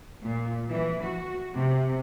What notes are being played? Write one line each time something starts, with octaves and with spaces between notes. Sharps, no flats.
A#2
E3
F#4
C3